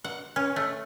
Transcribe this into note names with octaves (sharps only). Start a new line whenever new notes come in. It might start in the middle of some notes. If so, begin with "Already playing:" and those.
F#5
C#4
A3